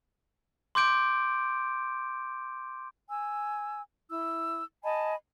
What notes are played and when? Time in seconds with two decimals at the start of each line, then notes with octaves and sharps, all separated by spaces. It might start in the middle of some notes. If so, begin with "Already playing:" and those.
0.75 C6 D6 G6 D7
3.09 G#5 E6
4.10 E4 E6
4.84 D#5 G#5 A5 B5